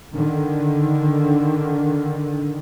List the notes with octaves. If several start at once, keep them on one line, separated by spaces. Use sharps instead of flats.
D3 D#3